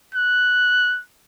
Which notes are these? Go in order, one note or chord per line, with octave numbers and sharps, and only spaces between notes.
F#6